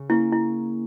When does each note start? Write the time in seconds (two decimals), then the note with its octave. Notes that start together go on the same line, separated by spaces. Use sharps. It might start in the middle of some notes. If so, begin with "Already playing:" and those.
Already playing: C#3
0.09 A#3 C#4 E4
0.32 E4